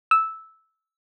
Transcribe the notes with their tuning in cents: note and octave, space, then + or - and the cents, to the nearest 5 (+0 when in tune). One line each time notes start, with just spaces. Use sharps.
E6 -10